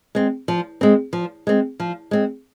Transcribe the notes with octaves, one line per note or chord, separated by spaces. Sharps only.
G#3 C4
F3
G#3 C4
F3
G#3 C4
F3
G#3 C4